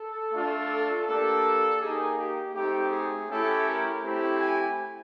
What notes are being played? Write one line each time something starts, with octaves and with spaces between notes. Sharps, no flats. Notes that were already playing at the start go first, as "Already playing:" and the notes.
Already playing: A4
A3 D4 F4
A#3 D4 G4 A4
A#3 D#4 G4 G#4
G4
A3 C4 D#4 G4
G#4
A3 C#4 E4 G4 A4
A#4
A3 C4 E4 G4
G#5